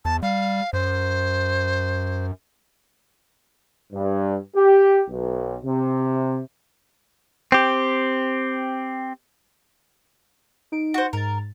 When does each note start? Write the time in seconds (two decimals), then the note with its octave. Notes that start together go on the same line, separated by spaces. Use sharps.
0.05 E2 A5
0.23 G3 F5
0.73 F#2 C5
3.93 G2
4.56 G4
5.10 B1
5.64 C3
7.52 C4 G4
10.72 D#4 D7
10.94 F#4 C5
11.13 G#2 A#4 A6